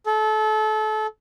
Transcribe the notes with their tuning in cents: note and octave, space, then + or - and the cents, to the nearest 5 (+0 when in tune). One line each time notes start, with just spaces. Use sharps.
A4 -30